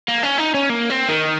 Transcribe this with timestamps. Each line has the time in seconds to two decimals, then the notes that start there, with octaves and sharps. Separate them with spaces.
0.09 A#3
0.23 C#4
0.38 D#4
0.54 C#4
0.70 A#3
0.90 C4
1.09 D#3